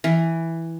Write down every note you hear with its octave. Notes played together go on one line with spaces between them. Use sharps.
E3